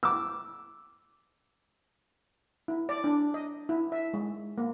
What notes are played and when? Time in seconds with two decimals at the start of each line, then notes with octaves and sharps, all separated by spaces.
0.03 D6 E6
2.68 E4
2.89 D5
3.04 D4
3.34 D#5
3.69 E4
3.92 E5
4.14 G#3
4.58 A#3